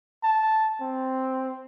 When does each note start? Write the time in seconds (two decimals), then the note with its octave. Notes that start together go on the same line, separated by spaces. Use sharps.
0.24 A5
0.81 C4